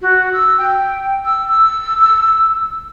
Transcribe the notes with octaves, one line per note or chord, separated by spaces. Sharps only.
F#4
E6
G5
E6
E6